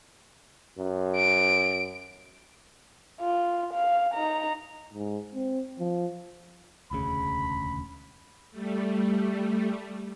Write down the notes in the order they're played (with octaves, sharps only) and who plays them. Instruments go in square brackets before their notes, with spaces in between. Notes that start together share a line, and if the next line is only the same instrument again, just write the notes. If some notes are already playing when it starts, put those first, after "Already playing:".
[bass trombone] F#2
[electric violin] D7
[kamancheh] F4
F5
D#4 A#5
[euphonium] G#2
C4
F3
[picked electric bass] E1 D2 C#3 [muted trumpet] B5
[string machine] G3 A3